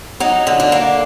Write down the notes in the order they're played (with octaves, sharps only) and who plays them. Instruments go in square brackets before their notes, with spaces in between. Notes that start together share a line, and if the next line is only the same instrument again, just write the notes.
[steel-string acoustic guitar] F#3 D#4
D3
D4
A#3